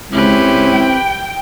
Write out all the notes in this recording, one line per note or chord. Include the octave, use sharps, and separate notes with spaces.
C#2 C4 C#4 E4 G4 B4
G5